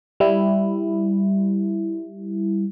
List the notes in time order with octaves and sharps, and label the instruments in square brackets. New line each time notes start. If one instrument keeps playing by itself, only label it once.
[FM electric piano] G3 E4